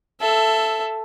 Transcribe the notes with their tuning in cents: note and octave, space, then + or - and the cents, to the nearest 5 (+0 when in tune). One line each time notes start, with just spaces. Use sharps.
A4 +0 E5 +15